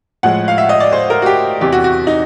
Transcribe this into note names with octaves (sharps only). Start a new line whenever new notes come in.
A2 F3 G#3 F#5
F5
E5
D#5
D5
C5
A#4
F#4
G4
E2 C3 E3 G4
F#4
F#4
D#4